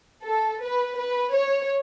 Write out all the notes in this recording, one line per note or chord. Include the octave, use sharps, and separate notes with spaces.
A4
B4
B4
C#5